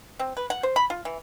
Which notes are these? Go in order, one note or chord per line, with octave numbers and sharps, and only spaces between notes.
C4
B4
F#5
C5
B5
F4
E3